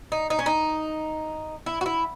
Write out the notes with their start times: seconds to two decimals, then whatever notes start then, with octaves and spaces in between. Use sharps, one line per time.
0.12 D#4
0.30 D#4
0.39 C#4
0.46 D#4
1.66 E4
1.81 F#4
1.86 E4